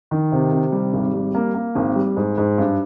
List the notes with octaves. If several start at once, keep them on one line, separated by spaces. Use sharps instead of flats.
D#3
C3
C3
G3
G#1
G3
A#3
A#3
G#1
G3
G#2
G#2
G2